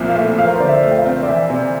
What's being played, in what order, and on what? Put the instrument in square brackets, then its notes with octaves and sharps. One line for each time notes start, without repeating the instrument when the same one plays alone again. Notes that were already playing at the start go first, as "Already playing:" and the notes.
Already playing: [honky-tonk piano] C2 A#2 F3 [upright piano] E5
[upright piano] F5
[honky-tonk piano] A3
[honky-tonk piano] F3 [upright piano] F5
[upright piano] A#4
C5
[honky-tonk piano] D3 [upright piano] D5
[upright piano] E5
[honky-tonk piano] A3
[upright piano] G5
F5
[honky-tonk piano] C4
[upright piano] D5
[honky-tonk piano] E3 [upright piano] E5
[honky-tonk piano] C3 [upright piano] D5